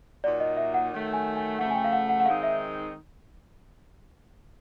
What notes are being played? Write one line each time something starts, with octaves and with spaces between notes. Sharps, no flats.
A#2 F#3 A#3 D#4 D5
D#5
E5
F#5
D#3 F#3 A3
G#5
G#5
C#3 F3 A3 F#5
G#5
G5
F5
F#5
F#5
F#5
D#3 G#3 C4 D#4 F5
E5